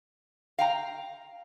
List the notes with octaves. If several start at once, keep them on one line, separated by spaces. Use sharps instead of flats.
F5 G5 A#5